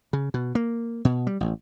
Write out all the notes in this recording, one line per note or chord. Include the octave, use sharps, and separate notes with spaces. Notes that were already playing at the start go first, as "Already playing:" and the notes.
C#3
B2
A#3
B2
G3
A1